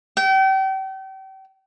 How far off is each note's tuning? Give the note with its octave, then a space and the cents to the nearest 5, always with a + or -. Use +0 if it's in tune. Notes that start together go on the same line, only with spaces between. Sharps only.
G5 -35